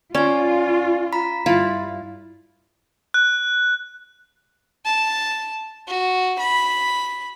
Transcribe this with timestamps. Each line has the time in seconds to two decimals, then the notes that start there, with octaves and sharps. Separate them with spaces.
0.15 C#4 F4 D5 G#5
1.13 A#5 B5 B6
1.46 G2 E4 F4 F5 A6
3.14 F#6
4.85 A5
5.87 F#4
6.39 B5